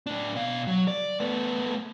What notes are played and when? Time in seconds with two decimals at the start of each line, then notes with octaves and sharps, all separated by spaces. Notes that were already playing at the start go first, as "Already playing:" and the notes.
0.07 A2 D4
0.35 B2 F5
0.67 F#3
0.88 D5
1.20 A3 B3